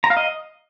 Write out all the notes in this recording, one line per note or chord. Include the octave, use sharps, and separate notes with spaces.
A#5
F5
D#5